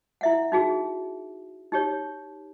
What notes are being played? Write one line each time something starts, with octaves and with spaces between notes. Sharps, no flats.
E4 E5 F#5
D#4 F#4 G#4
D#4 G4 C#5